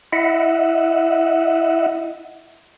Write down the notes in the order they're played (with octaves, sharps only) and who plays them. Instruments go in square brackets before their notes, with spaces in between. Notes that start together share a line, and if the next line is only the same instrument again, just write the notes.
[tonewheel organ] E4 D#5 E5 F#5